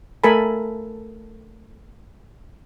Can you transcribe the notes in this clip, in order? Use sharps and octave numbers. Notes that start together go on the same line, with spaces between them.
A3 A4 A#4 G#5 A5 B5